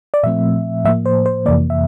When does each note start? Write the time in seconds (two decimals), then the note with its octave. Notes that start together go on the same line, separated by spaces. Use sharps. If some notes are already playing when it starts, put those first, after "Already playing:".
0.14 D5
0.23 A#2 F3 A3 C4 E5
0.85 A2 F3 A#3 E5
1.06 C5
1.26 C5
1.46 F2 C3 E3 A#3 D5
1.70 E5